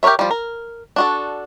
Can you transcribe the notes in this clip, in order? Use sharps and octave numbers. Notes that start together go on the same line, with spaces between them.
G4 A#4 B4 C#5 E5
F3 G3
A#4
D4 F#4 A4